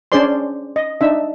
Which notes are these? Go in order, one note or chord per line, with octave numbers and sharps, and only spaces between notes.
C#4 D4 G#4 C5 D5 C6
D#5
D4 D#4 E5